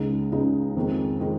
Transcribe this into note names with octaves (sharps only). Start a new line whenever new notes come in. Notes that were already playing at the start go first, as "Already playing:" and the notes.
Already playing: C#2 C#3 G#3 D#4
C#2 C#3 G#3 D#4
F2 D#3 G#3 D#4
D#3 G#3 D#4